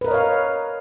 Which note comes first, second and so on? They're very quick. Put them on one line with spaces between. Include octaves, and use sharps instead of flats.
B4 A#4 D#5 C#5 F5